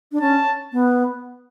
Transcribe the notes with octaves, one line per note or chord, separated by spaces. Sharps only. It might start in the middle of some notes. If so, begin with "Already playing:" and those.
D4
C#4 A5
B3